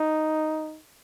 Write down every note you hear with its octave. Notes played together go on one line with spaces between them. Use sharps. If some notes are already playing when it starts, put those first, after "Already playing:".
Already playing: D#4